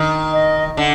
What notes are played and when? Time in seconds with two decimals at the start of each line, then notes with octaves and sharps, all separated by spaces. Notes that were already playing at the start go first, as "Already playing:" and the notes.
Already playing: D#3
0.33 D#5
0.77 D3 F#5